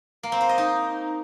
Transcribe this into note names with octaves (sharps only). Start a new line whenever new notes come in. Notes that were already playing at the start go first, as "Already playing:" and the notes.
A#3
C4
C5
D#5
D#4